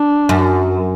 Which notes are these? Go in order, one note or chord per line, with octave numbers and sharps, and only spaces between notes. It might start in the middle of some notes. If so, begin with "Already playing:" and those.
Already playing: D4
F#2